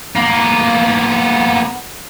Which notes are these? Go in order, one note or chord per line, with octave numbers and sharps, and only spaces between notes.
A#3 B3